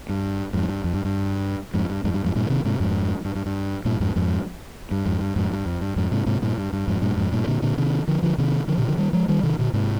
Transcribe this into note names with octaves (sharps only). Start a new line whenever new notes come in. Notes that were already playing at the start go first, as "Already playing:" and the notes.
G2
F2 G#2
G2
F2
G2
G2
F2 G#2
G2
F2 G#2
G2
F2 G#2
G2 A#2
C3 D#3
G#2 C3
F2 G#2
G2
G2
G2
G2 A#2
F2 G#2
F2 G#2
G2
F2 G#2
G2
F2 G#2
G2
F2
G2
F2 G#2
G#2 C3
G#2 C3
G2 A#2
G2
G2
F2 G#2
G2 A#2
F2 G#2
G2 A#2
A#2 D3
A#2 D3
C3 D#3
D3 F3
D3 F3
C3 D#3
D3 F3
A#2 D3
D3 F3
D#3 G3
F3 G#3
D#3 G3
C3 D#3
A#2 D3
G#2 C3